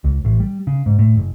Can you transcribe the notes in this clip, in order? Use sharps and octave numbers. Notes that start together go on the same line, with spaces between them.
C#2
A1
G3
C#3
G#2
A2
F#1